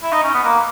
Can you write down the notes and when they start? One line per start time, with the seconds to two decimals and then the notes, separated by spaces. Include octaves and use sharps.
0.03 E4
0.12 D#4
0.23 C#4
0.33 B3
0.44 A#3